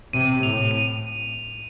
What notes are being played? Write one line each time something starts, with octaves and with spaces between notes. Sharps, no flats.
C3 D#7
D#7
A2 F7
D#7